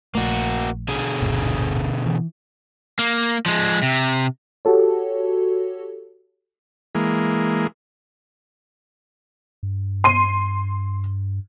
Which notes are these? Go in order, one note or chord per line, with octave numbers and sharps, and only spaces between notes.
A#1 A3 A#3 F#4
B2 D3 G#4
D1 G1 A#2
E3
A#3
F3 G#3
C3
F#4 G4 A4 C#5
E3 G#3 A#3
G2
C6 D#7